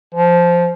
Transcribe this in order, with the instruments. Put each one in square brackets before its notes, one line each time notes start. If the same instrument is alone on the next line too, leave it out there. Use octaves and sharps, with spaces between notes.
[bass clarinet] F3